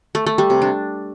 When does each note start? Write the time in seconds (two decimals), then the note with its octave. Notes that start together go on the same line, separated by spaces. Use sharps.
0.15 A3
0.26 A3
0.38 G3
0.50 C3
0.62 D4